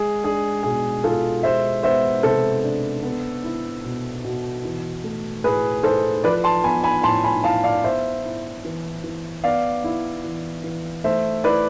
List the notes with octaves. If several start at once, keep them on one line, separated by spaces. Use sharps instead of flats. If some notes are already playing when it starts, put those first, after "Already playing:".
Already playing: G#3 G#4
D4 G#4
B2 G#4
B2 F4 A4
G#3 C5 E5
B3 C5 E5
C3 A4 C5
D4
B3
E4
B2
B2
E3
A3
A2 G#4 B4
E4 A4 C5
F3 B4 D5
A5 C6
B3 G#5 B5
G#5 B5
A2 A5 C6
G#5 B5
E4 F5 A5
D5 F5
B3 C5 E5
E4
E3
E3
B3 D5 F5
E4
E3
E3
A3 C5 E5
E4 B4 D5